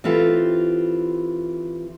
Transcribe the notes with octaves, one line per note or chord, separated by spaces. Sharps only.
E3 C4 F4 G4 A4